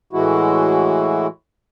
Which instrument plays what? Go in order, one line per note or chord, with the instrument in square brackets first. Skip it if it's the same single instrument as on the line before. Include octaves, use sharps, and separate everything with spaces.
[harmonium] A2 E3 G#3 E4 F#4